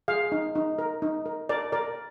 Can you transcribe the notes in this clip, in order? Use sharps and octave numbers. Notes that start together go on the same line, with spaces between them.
G#4 F5
D#4
D#4
A#4
D#4
A#4
A#4 D5
A#4 D5